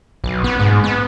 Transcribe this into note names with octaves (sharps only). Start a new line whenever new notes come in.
B1
B3
G#2
B3